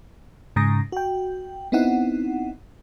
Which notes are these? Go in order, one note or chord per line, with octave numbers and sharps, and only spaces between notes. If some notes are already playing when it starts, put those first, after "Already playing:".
G#2 C#3 A#5 D#6 A#6
F#4 G5
B3 C4 D#4 E4 F#5